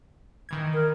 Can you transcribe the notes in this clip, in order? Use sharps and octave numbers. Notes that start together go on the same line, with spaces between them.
D#3 E3 G#6
A#4